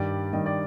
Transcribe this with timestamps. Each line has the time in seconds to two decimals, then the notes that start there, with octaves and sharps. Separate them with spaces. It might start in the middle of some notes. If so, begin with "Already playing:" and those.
Already playing: G2 D#3 G3 D5
0.33 G2 D#3 G3 D#5
0.46 D5